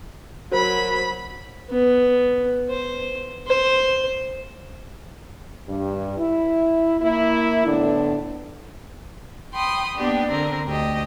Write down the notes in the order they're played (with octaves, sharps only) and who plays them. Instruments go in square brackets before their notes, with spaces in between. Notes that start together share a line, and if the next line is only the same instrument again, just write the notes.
[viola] F#3 B5 [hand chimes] F#4 A#4 C5
[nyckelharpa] B3
C5
C5
[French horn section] G2
E4
A#3 E4
A2 D3 A3 B3 D4
[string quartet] G5 B5 C6 D#6
A#3 B3 D4 G4
D3 C4 A#4
D2 G4 D#5